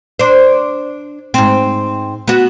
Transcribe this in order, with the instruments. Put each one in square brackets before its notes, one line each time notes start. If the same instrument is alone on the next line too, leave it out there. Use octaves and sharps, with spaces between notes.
[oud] D4 C5
G#2 C4
B3 F#4